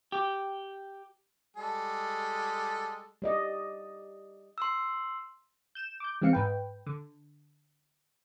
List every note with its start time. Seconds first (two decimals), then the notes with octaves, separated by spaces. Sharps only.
0.12 G4
1.57 G3 G#3 A4
3.22 G3 D5 D#5
4.58 C6 E6
5.75 G6 E7
6.00 D6 G6
6.22 E3 G#3 C4 F5 C#7
6.33 G#2 B4 G5
6.87 D3